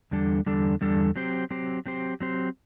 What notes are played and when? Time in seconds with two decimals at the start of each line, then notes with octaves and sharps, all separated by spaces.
0.11 E2 D3 G3 D4 A4
0.46 E2 D3 G3 D4 A4
0.81 E2 D3 G3 D4 A4
1.16 F#3 C4 G4 C5
1.50 F#3 C4 G4 C5
1.86 F#3 C4 G4 C5
2.20 F#3 C4 G4 C5